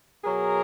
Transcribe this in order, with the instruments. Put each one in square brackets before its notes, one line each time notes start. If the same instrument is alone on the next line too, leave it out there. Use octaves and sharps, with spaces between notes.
[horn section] B2 F#3 G#4 A#4